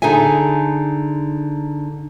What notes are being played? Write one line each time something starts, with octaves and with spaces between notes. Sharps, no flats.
D3 D#4 G#4 E5 G#5